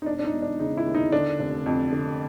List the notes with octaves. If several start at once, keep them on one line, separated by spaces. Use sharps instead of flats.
D#4
E1 D4
D4
D#4
E1
D4
C#3 D#4
E4
D#2
D#4
D3 D4
F1
F2
D3